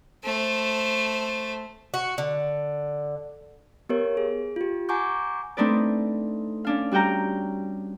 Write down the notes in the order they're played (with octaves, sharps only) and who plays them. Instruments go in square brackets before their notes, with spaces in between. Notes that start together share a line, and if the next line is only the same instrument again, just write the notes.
[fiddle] A3 C5
[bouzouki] F#4
D3
[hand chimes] B3 G4 A#4 C#5
G#4
F4 G4
F#5 G#5 A#5 C#6 D6 G6
[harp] A3 C4 D4 D#4 B4 D5
C#4 D4 F5
G3 F#4 G4 G5 A#5